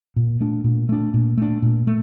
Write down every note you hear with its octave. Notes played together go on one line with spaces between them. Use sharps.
A#2
A3 D4
A#2
A3 D4
A#2
A3 D4
A#2
A3